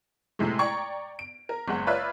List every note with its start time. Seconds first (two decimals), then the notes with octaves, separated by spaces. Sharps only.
0.39 A2 C3 G#3 A3
0.59 D5 G5 A#5 C#6 G#6
1.19 D7
1.49 A#4
1.68 F#1 G#3 F#5
1.87 F4 B4 C#5 D5 E5 F#6